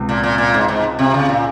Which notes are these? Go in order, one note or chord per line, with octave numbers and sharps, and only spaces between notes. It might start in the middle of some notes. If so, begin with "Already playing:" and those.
Already playing: C#2 C3
A#2
A#2
A#2
G#2
G#2
C3
C#3
A#2